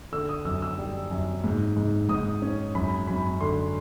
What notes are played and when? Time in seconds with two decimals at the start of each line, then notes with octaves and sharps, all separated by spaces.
0.12 D3 E6
0.29 D#6
0.45 F#2 E6
0.62 E6
0.78 G3
1.11 F#2
1.44 G#2
1.77 G#2
2.09 G#2 D#6
2.42 C#4
2.75 F#2 B5
3.07 F#2 B5
3.41 D3 C6